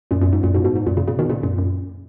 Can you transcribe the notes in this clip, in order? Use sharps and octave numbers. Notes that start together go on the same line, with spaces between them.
F#2 A#2
F#2 A#2
G#2
F#2 A#2
G#2 B2
G#2 B2
G#2
F#2 A#2
A#2 C#3
A#2 C#3
B2 D#3
A#2 C#3
F#2 A#2
F#2